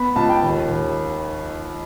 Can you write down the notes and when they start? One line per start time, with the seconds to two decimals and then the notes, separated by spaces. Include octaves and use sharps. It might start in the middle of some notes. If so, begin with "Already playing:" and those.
Already playing: B3 B5
0.16 C#2 A5
0.29 G5
0.42 D#2
0.69 D#2